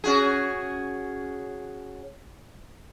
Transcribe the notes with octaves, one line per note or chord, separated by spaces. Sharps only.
C#4 F#4 G#4